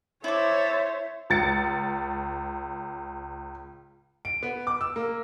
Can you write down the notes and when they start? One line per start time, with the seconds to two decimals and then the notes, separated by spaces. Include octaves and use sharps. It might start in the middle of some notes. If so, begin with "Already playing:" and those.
0.24 E4 A4 C5 C#5 E5 D6
1.30 C#2 A6 C#7
4.25 D7
4.43 B3
4.67 D6
4.81 E6
4.96 A#3